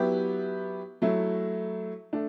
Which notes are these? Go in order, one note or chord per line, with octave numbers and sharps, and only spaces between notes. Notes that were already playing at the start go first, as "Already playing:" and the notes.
Already playing: F#3 B3 E4 G4
F#3 A3 E4
A3 D4